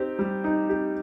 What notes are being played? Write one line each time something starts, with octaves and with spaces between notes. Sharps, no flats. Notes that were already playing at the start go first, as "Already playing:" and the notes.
Already playing: C4 D#4 G4
G3
D#4
G4